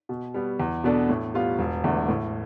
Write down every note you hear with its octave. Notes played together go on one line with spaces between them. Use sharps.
B2
G3 B3
E2
B2 B3 D4 A4
A2
G3 B3 F4
E1
E2 D3 A3
A2